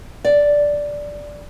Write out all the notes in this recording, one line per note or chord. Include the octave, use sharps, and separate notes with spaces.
D5